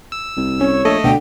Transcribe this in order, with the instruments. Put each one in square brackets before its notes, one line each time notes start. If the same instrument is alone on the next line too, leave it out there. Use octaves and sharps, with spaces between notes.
[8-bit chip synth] E6
[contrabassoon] C2
[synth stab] C#4 [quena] C#5
[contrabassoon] A#1 [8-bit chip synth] A3 D#5 [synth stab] A4
[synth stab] D2 B2 [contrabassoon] D3 [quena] G5